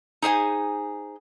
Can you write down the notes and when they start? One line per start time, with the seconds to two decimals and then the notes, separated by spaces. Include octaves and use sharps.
0.22 D#4 G#4 C5 G#5